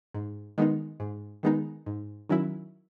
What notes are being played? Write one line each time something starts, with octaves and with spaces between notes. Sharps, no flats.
G#2
D#3 G#3 B3 D#4
G#2
D#3 G#3 B3 D#4
G#2
D#3 F#3 C#4 E4